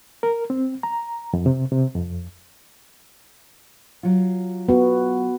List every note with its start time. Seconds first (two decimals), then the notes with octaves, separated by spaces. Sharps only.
0.23 A#4
0.50 C4
0.83 A#5
1.33 F2
1.46 C3
1.72 C3
1.95 F2
4.03 F#3 F4
4.69 B3 F#4